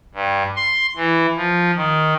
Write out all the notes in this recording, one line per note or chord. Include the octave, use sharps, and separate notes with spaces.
G2
C6
E3
F3
D#3